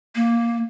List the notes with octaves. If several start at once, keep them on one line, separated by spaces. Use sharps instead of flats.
A#3